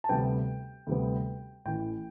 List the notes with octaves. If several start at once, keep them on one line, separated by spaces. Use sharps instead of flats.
A5
D2 C3 G3 B3 G5
D2 C3 G3 B3
A1 A2 E3 G5